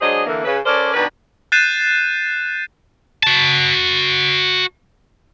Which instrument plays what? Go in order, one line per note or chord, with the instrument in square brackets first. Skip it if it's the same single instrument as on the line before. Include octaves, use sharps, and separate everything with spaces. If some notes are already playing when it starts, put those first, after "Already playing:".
[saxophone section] F#3 G#3 D4 G#4 C5 D#5
D3 E3 A#3
C#3 B4
C#4 A4 A#4 C5 D5
B2 D#3 D4 B4
[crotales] F#6 G6 A6 C7 D#7 E7
[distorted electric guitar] F#4 A5